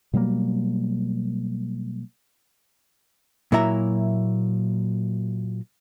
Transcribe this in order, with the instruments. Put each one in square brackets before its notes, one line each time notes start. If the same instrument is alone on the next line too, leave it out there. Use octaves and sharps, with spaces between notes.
[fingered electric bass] B2 F#3 G3 A#3
[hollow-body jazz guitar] A#2 F#3 A#3 E4 E5 A#5